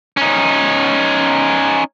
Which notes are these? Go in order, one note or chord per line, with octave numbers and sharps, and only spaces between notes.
C#4 D#4